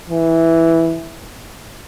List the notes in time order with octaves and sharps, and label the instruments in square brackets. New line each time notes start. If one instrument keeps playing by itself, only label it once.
[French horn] E3